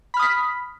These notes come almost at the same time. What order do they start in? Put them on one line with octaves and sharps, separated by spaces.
B5 F6 D#6 B6